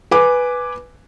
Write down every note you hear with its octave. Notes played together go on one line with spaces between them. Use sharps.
B4 G#5 D6